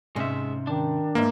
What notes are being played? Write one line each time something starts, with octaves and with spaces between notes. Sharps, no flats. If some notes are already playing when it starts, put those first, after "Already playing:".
G#2 C3 G#3 C#4 E5
D#3 D4
E2 G#2 A#3 E5